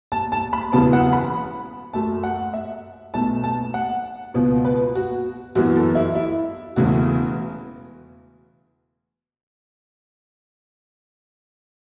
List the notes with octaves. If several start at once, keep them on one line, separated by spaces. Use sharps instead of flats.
A5
A5
B5
E1 E2 C#3 F#3 B3 A5
F#5
B5
F#2 F#3 A3 A5
F#5
E5
B1 B2 A3 A5
A5
F#5
C#2 B2 B3
B4
F#4
F#2 E3 B3 F#4
A4
E4
E4
E1 E2 C#3 E3 A3 F#4